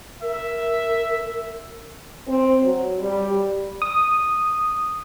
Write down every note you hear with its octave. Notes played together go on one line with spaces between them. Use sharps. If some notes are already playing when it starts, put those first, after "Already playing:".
A#4 E5
C4
F#3
G3
D#6